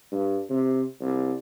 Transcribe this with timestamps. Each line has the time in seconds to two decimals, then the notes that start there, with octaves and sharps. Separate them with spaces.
0.12 G2
0.50 C3
1.01 C2